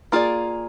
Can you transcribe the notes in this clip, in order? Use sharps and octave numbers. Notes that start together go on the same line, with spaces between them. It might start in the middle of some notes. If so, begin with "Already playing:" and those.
A#3 F4 G#4 D5